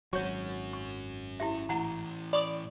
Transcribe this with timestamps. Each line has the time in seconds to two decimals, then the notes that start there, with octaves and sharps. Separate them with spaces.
0.13 G#1 F#3 C#4 F#4 C#5 C#6
0.73 C#6
1.40 E4 G4 E5
1.69 A2 E3 E4 F#5 A#5
2.33 D5 B5 C#6 D#6